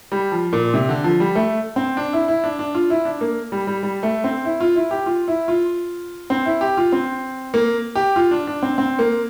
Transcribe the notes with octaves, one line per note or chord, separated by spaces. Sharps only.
G3
F3
A#2
C3
D3
F3
G3
A3
C4
D4
E4
E4
D4
D4
F4
E4
D4
A#3
G3
G3
G3
A3
C4
E4
F4
E4
G4
F4
E4
F4
C4
E4
G4
F4
C4
A#3
G4
F4
D4
D4
C4
C4
A#3